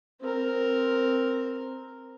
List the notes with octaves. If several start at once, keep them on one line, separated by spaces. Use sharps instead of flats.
C4 A#4